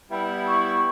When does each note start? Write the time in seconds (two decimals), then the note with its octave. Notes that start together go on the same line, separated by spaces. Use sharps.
0.11 G3 B3 E4
0.48 C#6